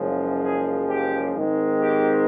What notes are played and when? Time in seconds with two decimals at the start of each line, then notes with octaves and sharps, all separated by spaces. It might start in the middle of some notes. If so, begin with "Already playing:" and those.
Already playing: F#1 F#2 C#3 F3 G#3
0.43 G#4
0.89 G4
1.35 G#2 D#3 G#3 C4
1.81 G4